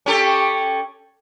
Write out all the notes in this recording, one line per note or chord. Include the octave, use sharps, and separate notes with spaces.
C#4 G4 A4